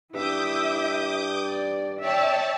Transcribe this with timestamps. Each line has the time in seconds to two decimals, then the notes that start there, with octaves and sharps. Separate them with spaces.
0.14 G2 E4 E5 D6 D#6 G6
1.45 D5
2.00 C#5 D5 E5 G5 A5